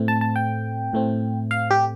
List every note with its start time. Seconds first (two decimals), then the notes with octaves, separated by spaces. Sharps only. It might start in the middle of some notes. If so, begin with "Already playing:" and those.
Already playing: A2 A3 C4
0.08 A5
0.21 A5
0.36 G5
0.93 A2 A3 C4
1.51 F5
1.71 G4